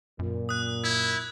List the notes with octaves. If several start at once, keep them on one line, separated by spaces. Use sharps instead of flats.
F#2 A#2
D#6 F#6
E4 G#6